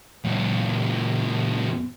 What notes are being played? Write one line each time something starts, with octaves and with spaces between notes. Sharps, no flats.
F#2 A#2